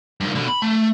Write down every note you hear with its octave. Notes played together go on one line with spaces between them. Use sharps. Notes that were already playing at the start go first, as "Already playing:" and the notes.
G2 D#3
B2 D3
B5
A3